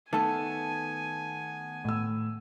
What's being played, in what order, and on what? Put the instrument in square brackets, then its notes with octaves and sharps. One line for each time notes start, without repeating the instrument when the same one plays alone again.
[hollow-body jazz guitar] D#3 A3 B3 [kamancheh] G#5 [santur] A5
[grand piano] A2 E6